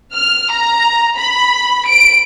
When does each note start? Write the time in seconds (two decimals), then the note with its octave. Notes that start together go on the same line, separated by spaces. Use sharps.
0.14 F6
0.52 A#5
1.18 B5
1.88 D7